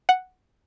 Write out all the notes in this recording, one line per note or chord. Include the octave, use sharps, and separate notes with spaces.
F#5